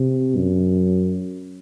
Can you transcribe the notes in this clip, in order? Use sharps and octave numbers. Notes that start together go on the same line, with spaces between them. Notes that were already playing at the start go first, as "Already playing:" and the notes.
Already playing: C3
F#2